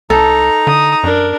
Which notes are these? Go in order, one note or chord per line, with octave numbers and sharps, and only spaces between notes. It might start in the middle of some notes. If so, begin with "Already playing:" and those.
C2 D#4 A4 A#5
D3 D#6
F#2 D4 A#4